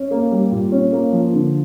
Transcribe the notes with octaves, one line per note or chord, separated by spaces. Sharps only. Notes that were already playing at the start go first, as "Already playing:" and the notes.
Already playing: C#4
A#3
G3
A#2
C#4
A#3
F3
D3